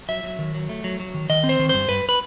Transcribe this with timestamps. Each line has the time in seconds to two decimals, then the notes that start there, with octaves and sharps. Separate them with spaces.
0.09 F#3 E5
0.23 F#3
0.39 D#3
0.55 F#3
0.69 A3
0.84 F#3
1.00 F#3
1.14 D#3
1.30 D#3 D#5
1.44 C4
1.49 C5
1.59 D#3
1.69 G2 C5
1.89 G2 B4
2.09 B4